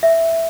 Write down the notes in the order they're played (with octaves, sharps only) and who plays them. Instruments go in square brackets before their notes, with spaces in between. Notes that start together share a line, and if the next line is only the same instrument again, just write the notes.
[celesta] E5